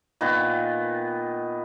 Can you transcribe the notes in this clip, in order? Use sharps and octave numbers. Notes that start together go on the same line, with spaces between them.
A#2 D#3 B3